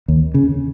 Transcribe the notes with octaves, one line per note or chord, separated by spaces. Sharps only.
D#2
C#3